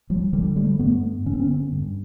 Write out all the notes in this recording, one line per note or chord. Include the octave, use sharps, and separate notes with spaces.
F3 G3
D3 F3 G3
G3 A3
G2 A3 B3
D3 C#4
C4
B3 C#4
G2